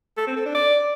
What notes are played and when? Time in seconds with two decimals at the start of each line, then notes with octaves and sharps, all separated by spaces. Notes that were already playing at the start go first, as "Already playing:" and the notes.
0.18 A4
0.27 C4
0.36 A4
0.45 D4
0.55 D5